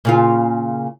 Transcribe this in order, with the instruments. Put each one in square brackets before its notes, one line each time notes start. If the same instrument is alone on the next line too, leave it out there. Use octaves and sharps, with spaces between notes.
[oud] A#2 C#3 F4